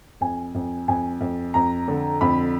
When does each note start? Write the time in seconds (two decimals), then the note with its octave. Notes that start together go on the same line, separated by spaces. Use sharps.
0.21 F2 G#5
0.55 F2
0.88 F2 G#5
1.21 F2
1.54 F2 A#5
1.88 D3
2.21 F2 B5